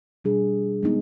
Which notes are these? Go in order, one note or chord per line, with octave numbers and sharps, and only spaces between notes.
B2 G3 D4 G#4
G#3 B3 D#4